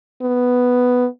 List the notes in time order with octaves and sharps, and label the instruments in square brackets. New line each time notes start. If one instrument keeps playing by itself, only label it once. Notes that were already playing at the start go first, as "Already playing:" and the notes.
[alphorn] B3